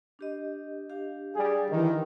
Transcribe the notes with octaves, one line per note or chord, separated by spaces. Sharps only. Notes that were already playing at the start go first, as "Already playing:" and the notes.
D4 G4 D#5
D4 G4 F5
G3 G#4
D#3 E3